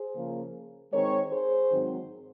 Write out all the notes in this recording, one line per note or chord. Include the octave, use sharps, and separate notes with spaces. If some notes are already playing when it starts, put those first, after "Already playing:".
Already playing: G#4 C5
C#3 F3 A#3
D#3 G#3 C4 A#4 C#5
G#4 C5
G#2 D#3 F#3 C4